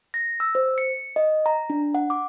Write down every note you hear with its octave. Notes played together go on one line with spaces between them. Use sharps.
A#6
E6
C5
C#7
D#5
A#5
D4
F#5
D6